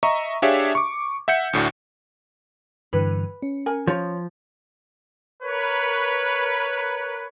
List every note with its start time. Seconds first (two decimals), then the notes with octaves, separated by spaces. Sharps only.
0.03 D#5 E5 A#5 C#6
0.42 D4 G4 G#4 C#5 E5 F5
0.75 C#6 D6
1.28 E5 F#5 G6 C#7
1.53 D2 A2 D4 F#4
2.93 G2 D3 E3 B4
3.42 C#4
3.66 A#4 G#5
3.87 F3 C#5
5.43 A#4 B4 C#5